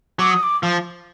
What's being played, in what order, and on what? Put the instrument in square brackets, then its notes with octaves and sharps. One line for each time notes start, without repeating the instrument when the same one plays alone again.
[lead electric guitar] F#3 [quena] D6
[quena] D#6
D6
[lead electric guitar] F3